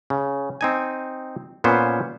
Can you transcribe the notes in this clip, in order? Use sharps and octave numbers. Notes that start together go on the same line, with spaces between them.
C#3
C4 D#4 G#5
A#2 B3 C#4 C5